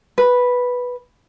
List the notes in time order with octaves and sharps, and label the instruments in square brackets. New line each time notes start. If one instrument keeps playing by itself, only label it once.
[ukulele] B4